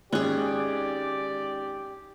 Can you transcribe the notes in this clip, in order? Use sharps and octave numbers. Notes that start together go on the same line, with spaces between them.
G#1 G#3 C#4 G4 G#4 D5 F#6